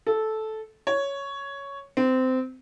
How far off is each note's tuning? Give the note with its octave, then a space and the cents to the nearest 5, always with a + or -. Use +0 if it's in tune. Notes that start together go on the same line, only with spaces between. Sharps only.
A4 -10
C#5 +5
C4 -20